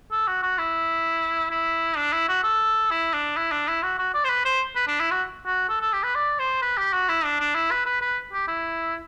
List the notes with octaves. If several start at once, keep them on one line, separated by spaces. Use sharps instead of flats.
A4
F#4
F#4
E4
E4
D4
E4
F#4
A4
E4
D4
E4
D4
E4
F#4
F#4
D5
C5
B4
C5
B4
D4
E4
F#4
F#4
A4
A4
G4
B4
D5
C5
B4
G4
F#4
E4
D4
D4
E4
B4
B4
B4
G4
E4